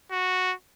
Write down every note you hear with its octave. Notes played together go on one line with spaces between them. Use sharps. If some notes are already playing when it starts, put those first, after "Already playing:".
F#4